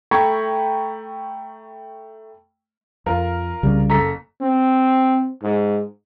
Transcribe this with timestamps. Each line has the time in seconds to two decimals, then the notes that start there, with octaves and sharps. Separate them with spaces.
0.11 A3 G5 A#5 B5 C#6 G#6
3.06 F2 F4 A#4 F5
3.63 C2 C#3 G3
3.90 F#1 A4 A#5 B6
4.41 C4
5.43 G#2